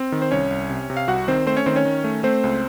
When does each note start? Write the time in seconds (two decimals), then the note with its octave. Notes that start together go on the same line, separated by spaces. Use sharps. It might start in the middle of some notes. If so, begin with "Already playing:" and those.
Already playing: C4
0.12 D#3
0.22 C5
0.31 C2 C#4 C#5
0.51 C2
0.70 C3
0.90 C3
0.97 F5
1.08 C2 F#4 F#5
1.28 D#3 C4 C5
1.46 A3 C4 C5
1.57 C#4 C#5
1.66 D#3 C4 C5
1.76 C#4 C#5
1.85 D#3
2.04 A3
2.23 A3 C4 C5
2.44 C#2